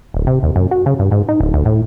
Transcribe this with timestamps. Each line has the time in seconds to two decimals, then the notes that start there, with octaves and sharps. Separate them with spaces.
0.14 D1
0.27 C3
0.43 D#2
0.56 F#2
0.71 F#4
0.86 C#3
0.99 G2
1.11 G#2
1.28 D#4
1.40 D1
1.54 D2
1.65 A2